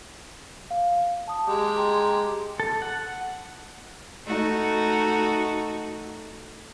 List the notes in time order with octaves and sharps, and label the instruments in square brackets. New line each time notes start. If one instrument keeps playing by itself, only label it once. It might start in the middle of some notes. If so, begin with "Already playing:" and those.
[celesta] F5
A5 D#6
[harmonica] G#3 G4
[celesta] G5 A#5 C6
[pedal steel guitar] A4
F#5
[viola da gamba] A3 D#4 F#4